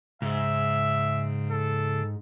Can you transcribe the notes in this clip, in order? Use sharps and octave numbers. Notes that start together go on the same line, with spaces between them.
G#2 C#3 E5
A4